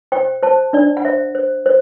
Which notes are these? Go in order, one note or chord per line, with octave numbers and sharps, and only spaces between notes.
C5 G5
C5 A5
D4 D5
F#5
C5 E5
C5
C5